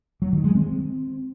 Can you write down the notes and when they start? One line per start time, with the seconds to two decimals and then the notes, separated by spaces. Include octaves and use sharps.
0.22 F#3
0.33 D#3
0.44 G#3
0.55 C4